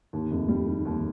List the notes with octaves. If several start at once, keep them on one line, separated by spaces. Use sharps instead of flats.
D#2
F1
G3
D#3
D#2